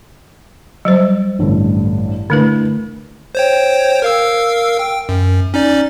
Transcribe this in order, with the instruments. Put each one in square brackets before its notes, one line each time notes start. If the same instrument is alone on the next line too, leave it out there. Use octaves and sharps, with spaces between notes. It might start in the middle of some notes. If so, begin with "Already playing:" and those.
[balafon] F#3 G3 C5
[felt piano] A1 G2 D3
[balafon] D3 A3 B4 [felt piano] D4 E4
[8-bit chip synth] C5 C#5 G5
A#4 F5 E6
G5
F#2
C#4 D#4 D5